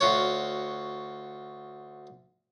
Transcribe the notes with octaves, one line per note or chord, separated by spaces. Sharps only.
D2 F4 F#4 C#5